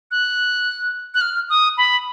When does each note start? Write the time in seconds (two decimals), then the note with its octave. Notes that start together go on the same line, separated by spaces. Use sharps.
0.11 F#6
1.14 F#6
1.21 F6
1.49 D#6
1.77 B5